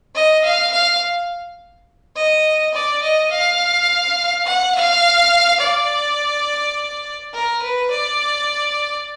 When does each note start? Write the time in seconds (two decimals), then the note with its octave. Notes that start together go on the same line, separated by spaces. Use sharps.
0.15 D#5
0.44 F5
0.72 F5
2.17 D#5
2.74 D5
3.03 D#5
3.31 F5
4.46 F#5
4.75 F5
5.60 D5
7.34 A#4
7.62 B4
7.91 D5